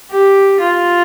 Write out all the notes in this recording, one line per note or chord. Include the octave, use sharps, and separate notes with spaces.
G4
F4